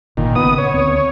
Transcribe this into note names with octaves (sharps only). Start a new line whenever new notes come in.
G#1 A#2 D#3
C#3 B3 D#6
C#5
D2 C4